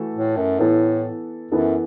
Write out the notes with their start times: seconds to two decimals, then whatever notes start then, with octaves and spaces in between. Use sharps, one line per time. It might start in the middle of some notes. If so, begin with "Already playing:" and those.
Already playing: E3 A3 F#4 A4
0.14 A2
0.37 F#2
0.59 A2 E3 B3 E4 A4
1.51 F#2 E3 B3 E4 A4